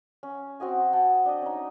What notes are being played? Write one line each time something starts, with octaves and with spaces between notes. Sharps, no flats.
C#4
C4 F#4 D#5 G#5
F#5 G5 A5
D4 D#5
C#4 D#4